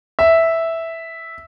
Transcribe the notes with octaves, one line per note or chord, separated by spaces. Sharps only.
E5